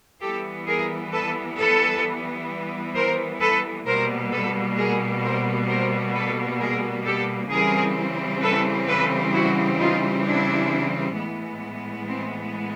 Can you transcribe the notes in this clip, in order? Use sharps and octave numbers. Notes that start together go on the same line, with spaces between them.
E3 G3 B3 G4 A4
G#4 A#4
A4 B4
A4 B4
A#4 C5
A4 B4
B2 G3 A#3 A#4 C5
A4 B4
G#4 A#4
A#4 C5
A#4 C5
A4 B4
G#4 A#4
G4 A4
C#3 E3 G3 C4 G#4 A#4
A4 B4
A4 B4
E4 F#4
D#4 F4
D4 E4
A2 E3 G#3 B3
C4